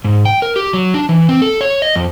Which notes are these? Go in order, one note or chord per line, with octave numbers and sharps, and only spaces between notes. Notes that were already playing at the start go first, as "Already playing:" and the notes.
G#2
G5
A#4
G4
F#3
D4
E3
C4
A4
C#5
D#5
F2